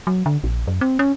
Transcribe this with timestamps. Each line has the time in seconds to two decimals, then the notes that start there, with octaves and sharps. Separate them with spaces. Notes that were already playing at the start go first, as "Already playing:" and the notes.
0.07 F#3
0.26 D3
0.44 A#1
0.67 F#2
0.81 C4
0.99 C#4